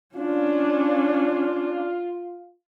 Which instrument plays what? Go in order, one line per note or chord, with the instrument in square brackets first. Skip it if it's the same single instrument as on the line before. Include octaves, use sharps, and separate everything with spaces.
[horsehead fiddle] C#4 D4 [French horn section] F4